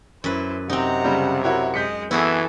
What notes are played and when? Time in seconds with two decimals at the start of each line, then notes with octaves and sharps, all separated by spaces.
0.24 F#2 E4 B4 C5
0.70 C3 C4 D#4 F#5 A#5
1.04 C#3 G3
1.44 E4 F#4 A#4 C#5
1.74 G#3 D#5 G6 B6 C#7
2.11 E3 B3 E4 F#4 G#4 A4